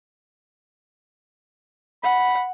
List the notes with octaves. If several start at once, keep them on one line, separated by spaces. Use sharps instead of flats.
F#5 B5